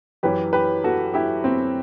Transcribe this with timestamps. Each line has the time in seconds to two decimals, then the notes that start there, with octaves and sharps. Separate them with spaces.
0.23 F#2 E3 G4 B4
0.53 G4 B4
0.84 F#4 A4
1.14 E4 G4
1.44 C4